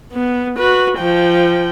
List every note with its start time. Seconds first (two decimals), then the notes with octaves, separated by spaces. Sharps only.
0.12 B3
0.58 F#4 B4
0.98 F3 G5